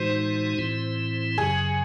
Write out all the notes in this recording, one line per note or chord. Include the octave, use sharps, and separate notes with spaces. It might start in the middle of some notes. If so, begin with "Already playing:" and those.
Already playing: A2 E3 G#3 D#4 F#4 C5
A2 E3 C4 E4
F#2 C#3 F#3 G#4